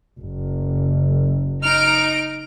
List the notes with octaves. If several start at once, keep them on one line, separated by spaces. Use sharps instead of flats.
F#1
D#4 F6 D7